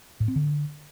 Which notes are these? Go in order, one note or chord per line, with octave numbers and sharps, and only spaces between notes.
A2
C4
D3